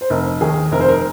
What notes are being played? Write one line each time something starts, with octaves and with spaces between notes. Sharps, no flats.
C5
F1 A#4
D#2 D#3 G#4
F1 A#4
C5
A#4